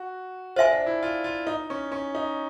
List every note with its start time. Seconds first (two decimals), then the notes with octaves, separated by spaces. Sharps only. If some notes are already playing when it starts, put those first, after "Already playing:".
Already playing: F#4
0.56 F4 C5 E5 G#5
0.72 D4
0.86 E4
1.03 F4
1.24 F4
1.47 D#4
1.70 C#4
1.92 C#4
2.15 D#4